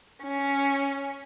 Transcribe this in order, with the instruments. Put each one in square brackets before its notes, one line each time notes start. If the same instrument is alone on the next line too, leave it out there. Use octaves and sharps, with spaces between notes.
[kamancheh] C#4